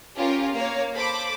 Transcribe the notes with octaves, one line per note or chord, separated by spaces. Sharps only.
C#4 F4 G4 A#4
A#3 C#5 F5
A4 C5 B5 D6